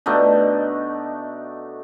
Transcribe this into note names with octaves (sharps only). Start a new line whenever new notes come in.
B2 A3 D4 D#4